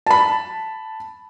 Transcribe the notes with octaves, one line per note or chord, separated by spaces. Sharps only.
A5 B5